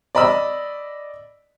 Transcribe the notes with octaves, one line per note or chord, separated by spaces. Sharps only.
D5 D#5 B5 D#6 E6